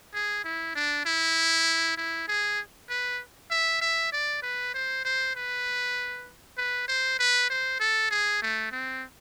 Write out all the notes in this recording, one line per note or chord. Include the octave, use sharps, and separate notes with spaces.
G#4
E4
D4
E4
E4
G#4
B4
E5
E5
D5
B4
C5
C5
B4
B4
C5
B4
C5
A4
G#4
A3
C4